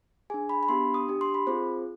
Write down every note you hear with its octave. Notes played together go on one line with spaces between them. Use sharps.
D4 G#4 G#5
B5
B5
B3 D4 G4 C6
D#6
D4 G4
C6
B5
C4 F4 G#4 C5